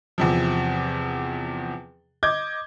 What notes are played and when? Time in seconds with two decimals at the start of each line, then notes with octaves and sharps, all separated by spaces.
0.18 E2 C3 F3
2.23 D#5 D6 G6 G#6